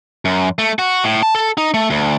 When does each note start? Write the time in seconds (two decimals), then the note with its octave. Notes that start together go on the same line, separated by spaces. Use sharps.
0.25 F#2
0.59 A3
0.79 F#4
1.04 A2
1.23 A5
1.35 A4
1.58 D#4
1.74 A3
1.90 D2